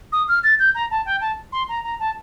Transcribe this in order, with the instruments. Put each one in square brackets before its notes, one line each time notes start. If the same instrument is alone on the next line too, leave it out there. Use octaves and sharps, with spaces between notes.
[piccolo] D#6
F6
A6
G6
A#5
A5
G5
A5
C6
A#5
A#5
A5